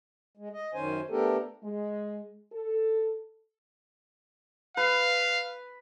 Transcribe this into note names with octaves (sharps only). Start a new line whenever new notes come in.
G#3
D#5
F#2 D#3 C#4 C5 G#5
A3 B3 D4 G4 A4 A#4
G#3
A4
B4 F5